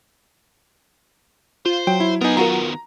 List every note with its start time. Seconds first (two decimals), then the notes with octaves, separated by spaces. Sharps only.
1.66 F4 C5
1.87 F#3 G5
2.00 E4
2.21 B3 D#4 A#4 G#5
2.37 D#3 B3 F4 F#4 A#4 A#5